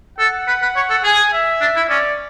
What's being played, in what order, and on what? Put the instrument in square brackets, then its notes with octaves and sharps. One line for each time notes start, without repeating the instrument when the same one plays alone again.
[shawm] A4 [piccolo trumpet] F#5
[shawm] B4
B4
C#5
A4
[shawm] G#4 [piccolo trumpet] G#5
[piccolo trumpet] E5
[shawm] D4
E4
[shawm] C#4 [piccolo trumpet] D5